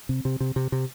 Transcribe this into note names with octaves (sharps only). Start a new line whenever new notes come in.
C3
C3
C3
C3
C3